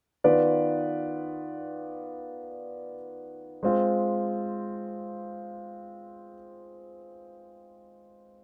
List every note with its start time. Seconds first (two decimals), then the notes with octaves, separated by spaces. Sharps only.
0.24 D#3 B3 F4 B4 D5
3.63 G#3 C4 F4